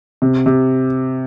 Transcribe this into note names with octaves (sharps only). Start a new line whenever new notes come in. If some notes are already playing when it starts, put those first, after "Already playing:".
C3
C3